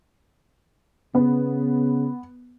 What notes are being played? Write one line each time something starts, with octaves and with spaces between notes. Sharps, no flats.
C#3 B3